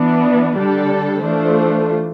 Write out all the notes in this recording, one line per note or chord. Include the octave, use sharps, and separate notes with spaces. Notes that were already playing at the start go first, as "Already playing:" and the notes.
Already playing: E3 B3 D4
D3 G3 D4 A4
E3 A3 D4 F4 C5